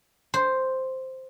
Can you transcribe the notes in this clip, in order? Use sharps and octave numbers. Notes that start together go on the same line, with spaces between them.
C5